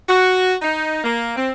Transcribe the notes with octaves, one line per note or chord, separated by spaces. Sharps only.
F#4
D#4
A#3
C4